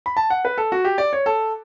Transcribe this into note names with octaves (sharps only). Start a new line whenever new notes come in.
B5
A5
F#5
B4
A4
F#4
G4
D5
C#5
A4